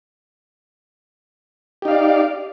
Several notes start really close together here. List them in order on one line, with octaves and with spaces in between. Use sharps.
G4 D#4 F5 D5